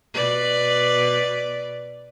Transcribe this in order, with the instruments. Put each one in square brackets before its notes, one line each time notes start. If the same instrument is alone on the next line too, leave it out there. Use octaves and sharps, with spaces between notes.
[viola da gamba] B2 B4 D5